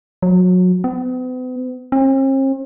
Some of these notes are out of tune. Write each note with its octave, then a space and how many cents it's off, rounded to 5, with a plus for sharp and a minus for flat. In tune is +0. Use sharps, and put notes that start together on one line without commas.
F#3 -25
B3 +45
C4 +45